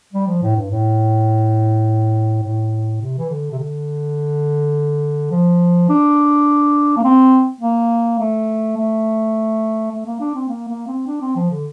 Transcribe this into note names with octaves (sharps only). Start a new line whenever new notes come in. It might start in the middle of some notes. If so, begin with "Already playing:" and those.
G3
F3
A2
G2
A2
A2
C3
E3
D3
C3
D3
F3
D4
A#3
C4
A#3
A3
A3
A3
A#3
D4
C4
A#3
A#3
C4
D4
C4
F3
D3